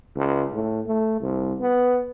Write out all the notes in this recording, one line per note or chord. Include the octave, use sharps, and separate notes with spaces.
C#2
A2
A3
C2
B3